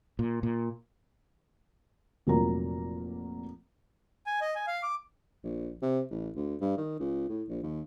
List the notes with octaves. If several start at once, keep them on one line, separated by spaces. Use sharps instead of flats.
A#2
A#2
F1 A#2 F#3 A#3 A#5
G#5
D#5
G#5
F5
D6
A#1
C3
A1
D2
G2
D#3
C#2
A2
A#1
D#2